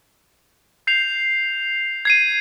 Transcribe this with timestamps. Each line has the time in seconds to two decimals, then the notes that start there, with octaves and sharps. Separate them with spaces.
0.87 G6 C7 F7
2.05 G#6 C7 D#7